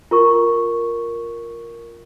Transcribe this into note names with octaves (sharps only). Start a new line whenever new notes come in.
F4 A#4 C#6